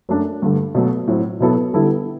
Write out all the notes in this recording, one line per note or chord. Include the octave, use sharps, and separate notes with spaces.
F#2 F#3 A3 D4
G2 D3 A3
B2 F#3 A3
A2 F#3 C4
B2 F#3 B3 E4 A4
D3 G3 B3 E4 A4